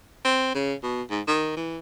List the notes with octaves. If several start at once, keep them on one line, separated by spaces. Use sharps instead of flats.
C4
C#3
B2
G#2
D#3
E3